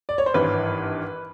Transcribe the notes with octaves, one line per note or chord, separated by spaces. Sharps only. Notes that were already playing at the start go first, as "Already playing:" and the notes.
D5
C#5
C5
G#1 G2 E3 B4